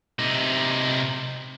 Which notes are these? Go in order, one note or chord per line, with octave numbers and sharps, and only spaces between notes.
C3 D#4